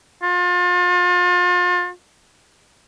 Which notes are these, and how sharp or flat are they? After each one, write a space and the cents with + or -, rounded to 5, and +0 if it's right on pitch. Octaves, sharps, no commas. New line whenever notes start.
F4 +35